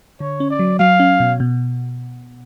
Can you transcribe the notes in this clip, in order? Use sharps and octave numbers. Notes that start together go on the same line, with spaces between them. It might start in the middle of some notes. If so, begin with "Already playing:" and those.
D3 C#5
C#4
D5
F#3
F#3 F5
C#4
B2
B2